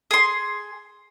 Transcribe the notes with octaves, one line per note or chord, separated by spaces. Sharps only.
G#4 C6